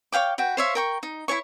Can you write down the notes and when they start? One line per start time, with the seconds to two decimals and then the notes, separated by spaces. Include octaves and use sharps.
0.12 C#5 F5 G5 D6
0.38 F#4 B4 G5
0.57 C5 C#5 E5 F5
0.75 A#4 G5 C#6
1.03 D#4
1.28 E4 A4 C#5 C#6